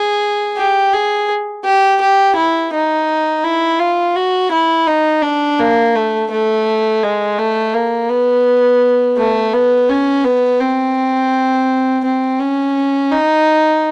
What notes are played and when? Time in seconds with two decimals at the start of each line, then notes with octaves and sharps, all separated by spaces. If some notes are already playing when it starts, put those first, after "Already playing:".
Already playing: G#4
0.57 G4
0.93 G#4
1.65 G4
2.01 G4
2.36 E4
2.73 D#4
3.44 E4
3.80 F4
4.16 F#4
4.52 E4
4.87 D#4
5.23 D4
5.60 A#3
5.95 A3
6.31 A3
7.03 G#3
7.38 A3
7.74 A#3
8.10 B3
9.17 A3
9.53 B3
9.89 C#4
10.24 B3
10.60 C4
12.04 C4
12.40 C#4
13.12 D#4